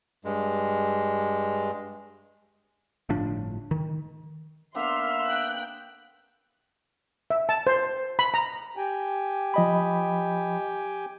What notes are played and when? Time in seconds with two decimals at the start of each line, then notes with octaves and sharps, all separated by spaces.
0.25 G2 G#3
3.09 G1 A2 F3 D4
3.71 D#3
4.75 D3 A#3 B3 E5 C6 F6
5.27 G5 F#6
7.30 E5
7.49 A5
7.67 C5
8.19 B5
8.34 A#5
8.76 G4 G5 G#5
9.54 F3 D#5 B5